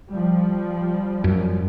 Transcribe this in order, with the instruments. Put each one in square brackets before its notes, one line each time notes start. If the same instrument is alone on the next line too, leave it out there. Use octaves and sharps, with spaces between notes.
[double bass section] F3 G3
[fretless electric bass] F#2